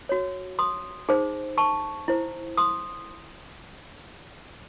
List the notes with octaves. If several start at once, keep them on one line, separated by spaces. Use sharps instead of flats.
F#4 C#5
C6 D#6
D#4 G#4 C5
A5 C#6
E4 C5
C6 D#6